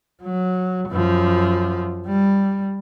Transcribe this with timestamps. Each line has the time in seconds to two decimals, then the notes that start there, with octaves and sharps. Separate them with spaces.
0.23 F#3
0.89 F#2 F3
2.07 G3